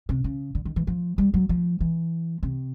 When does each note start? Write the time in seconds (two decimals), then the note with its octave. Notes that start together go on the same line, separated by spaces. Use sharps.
0.09 C3
0.24 C#3
0.55 D3
0.65 D#3
0.76 E3
0.87 F3
1.18 G3
1.34 F#3
1.49 F3
1.81 E3
2.43 C3